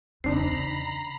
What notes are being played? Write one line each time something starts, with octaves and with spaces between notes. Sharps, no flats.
E2 C#3 C4 D4 D#4 A#5 B5 C7